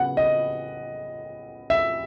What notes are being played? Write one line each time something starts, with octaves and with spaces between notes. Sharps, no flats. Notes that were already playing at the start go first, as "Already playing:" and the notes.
Already playing: C#3 F#3 B3 F#5
D#5
E5